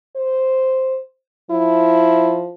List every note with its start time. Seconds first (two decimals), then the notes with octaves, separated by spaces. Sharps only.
0.16 C5
1.51 F3 E4